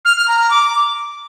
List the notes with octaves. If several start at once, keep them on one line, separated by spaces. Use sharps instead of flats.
F6
F6
A#5
A#5
D6